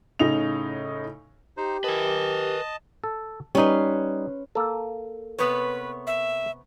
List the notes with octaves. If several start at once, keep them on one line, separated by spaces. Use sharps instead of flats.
A2 C#3 D#4 F7
D#4 G4 C5
A#4 B4 D#5 G#5 A5
A4
G3 C#4 D#4 B4 C6
A#3 A4
C3 B3 B4 C#5
E5